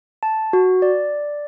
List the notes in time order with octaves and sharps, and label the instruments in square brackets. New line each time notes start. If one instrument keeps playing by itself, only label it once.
[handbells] A5
F#4
D5